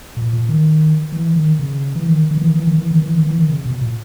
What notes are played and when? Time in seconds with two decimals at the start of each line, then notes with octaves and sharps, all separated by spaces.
0.17 A#2
0.33 A#2
0.49 D#3
1.12 E3
1.36 D#3
1.59 C#3
1.95 E3
2.07 D#3
2.31 D#3
2.38 E3
2.46 D#3
2.55 E3
2.67 D#3
2.78 E3
2.91 D#3
3.02 E3
3.14 D#3
3.26 E3
3.38 D#3
3.49 C#3
3.66 B2
3.81 A#2